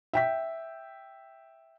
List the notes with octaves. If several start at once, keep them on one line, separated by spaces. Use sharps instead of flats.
E5 G5 B6